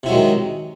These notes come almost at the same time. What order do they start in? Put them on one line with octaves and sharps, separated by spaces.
C3 E4 F#3 G#3 D#3